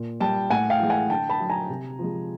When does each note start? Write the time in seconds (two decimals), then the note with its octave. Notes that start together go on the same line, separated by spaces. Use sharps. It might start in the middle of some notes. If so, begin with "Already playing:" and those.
Already playing: A#2
0.21 G3 G5 A5
0.50 A2 F#5 G#5
0.70 F5 G5
0.80 E3 G#3
0.90 F#5 G#5
1.10 D3 G5 A5
1.30 A5 B5
1.40 F#3
1.49 G#5 A#5
1.69 C3
1.99 F3 G#3